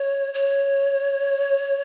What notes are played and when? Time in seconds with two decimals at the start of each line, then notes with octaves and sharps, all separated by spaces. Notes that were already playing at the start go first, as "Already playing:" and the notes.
Already playing: C#5
0.34 C#5